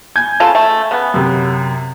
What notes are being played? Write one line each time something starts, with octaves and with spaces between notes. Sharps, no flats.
G#5 G6 G#6
C#3 F4 A4
A3
C#3 B3
F#2 C3